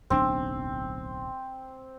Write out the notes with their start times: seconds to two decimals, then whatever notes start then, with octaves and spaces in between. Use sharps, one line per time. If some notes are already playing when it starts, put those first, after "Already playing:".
0.10 D1 B1 C4 D4